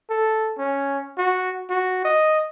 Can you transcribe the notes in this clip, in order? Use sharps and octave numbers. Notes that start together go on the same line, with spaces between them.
A4
C#4
F#4
F#4
D#5